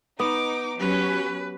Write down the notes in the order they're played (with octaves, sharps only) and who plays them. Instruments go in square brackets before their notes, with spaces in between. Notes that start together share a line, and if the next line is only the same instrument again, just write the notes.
[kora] B3 [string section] D#4 [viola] D6
[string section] F#3 C#4 [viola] G4 B4